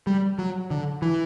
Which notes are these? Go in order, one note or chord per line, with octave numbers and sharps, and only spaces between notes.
G3
F#3
D3
E3